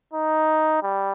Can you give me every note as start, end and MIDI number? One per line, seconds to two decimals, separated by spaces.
0.14 0.83 63
0.83 1.13 55